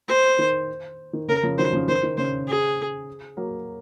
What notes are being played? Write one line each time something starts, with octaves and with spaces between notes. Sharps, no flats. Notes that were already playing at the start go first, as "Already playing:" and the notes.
C5
D#3
D#3
C#3 A#4
C#3 F3
D#3 F#3 C5
C#3 F3
D#3 C5
D#3
C#3 C5
G#4
F#3 A#3